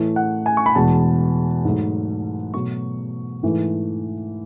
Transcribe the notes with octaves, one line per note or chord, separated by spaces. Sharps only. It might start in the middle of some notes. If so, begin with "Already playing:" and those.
Already playing: A2 E3 A3
F#5
G#5
C#6
B5
E2 B2 G#3 A5
G#2 F#3 A3
B2 F#3 A3 C#6
G#2 E3 A3